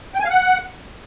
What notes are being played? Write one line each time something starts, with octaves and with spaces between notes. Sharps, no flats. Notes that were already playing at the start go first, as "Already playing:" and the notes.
G5
G#5
F5
F#5